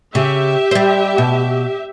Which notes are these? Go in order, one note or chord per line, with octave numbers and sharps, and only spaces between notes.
C#3 G4 E5
G3 C5
B2